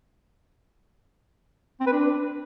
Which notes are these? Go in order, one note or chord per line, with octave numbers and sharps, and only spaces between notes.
C4
B4
D4